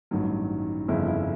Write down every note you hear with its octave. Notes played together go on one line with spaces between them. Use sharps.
A1 G2 D#3 F#3
G1 F2 C#3 E4
E4